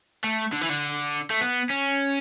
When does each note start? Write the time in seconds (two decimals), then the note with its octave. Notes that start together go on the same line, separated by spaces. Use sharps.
0.24 A3
0.53 D3
0.62 E3
0.70 D3
1.30 A3
1.41 B3
1.70 C#4